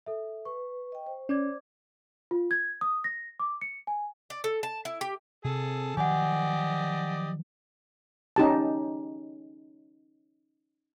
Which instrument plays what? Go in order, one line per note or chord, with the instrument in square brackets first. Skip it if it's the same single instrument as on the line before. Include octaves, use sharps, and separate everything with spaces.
[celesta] A4 E5
[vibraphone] B4 [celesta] C#6
[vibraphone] D#5 G5
C5
[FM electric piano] C#4 [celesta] D5 D6 G#6
[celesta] F4
G#6
D#6
A#6
D6
C#7
G#5
[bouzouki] D5
A4
A5
E4
G4
[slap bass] C3 [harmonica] G#4 A4
[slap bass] D#3 F3 F#3 [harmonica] G4 D5 D#5 [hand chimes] F#5 G#5
[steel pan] C#4 D#4 G4 A5